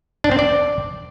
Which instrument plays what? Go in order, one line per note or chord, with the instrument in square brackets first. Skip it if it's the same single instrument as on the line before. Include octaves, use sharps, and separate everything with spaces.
[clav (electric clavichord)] D4
C4
D5